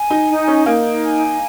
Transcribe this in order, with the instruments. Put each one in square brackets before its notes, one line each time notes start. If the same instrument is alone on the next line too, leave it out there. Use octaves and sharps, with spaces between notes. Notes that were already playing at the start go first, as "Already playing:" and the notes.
Already playing: [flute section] G#5
[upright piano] D#4
[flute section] D#4
[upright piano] C#4
[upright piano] A#3 [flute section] D#4
[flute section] G#5